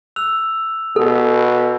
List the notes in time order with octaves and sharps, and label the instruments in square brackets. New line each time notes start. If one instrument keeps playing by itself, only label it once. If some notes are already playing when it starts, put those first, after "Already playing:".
[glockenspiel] E6 F#6 F7
[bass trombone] B2 [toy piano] A4